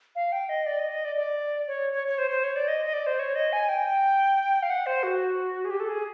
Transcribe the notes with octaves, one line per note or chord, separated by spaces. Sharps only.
F5
G5
D#5
D5
D#5
D#5
D5
D5
C#5
C#5
C#5
C5
C5
C#5
D5
D#5
D#5
D5
C5
C#5
D#5
G#5
G5
F5
F#5
C5
F#4
G#4
G4
A4
G#4